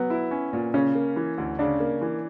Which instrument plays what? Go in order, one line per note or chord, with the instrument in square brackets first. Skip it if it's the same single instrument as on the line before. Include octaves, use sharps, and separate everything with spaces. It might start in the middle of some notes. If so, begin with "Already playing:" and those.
Already playing: [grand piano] F#3 [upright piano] B3
[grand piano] E4
C#4
A#2
[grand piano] C#3 [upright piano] C#4
[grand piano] A#3
E3
D2
[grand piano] C#3 [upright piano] D4
[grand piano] A#3
E3